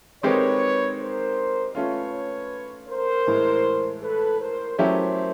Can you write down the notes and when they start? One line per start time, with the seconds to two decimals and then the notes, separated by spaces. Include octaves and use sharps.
0.23 D#3 G#3 C4 D#4 G4 B4 C#5
0.99 A#4 C5
1.75 A3 C#4 F4 B4 C#5
2.88 A#4 C5
3.27 A2 E3 G#3
4.03 A4 B4
4.40 A#4 C5
4.78 F#3 A3 C#4 E4 G4 A#4 C5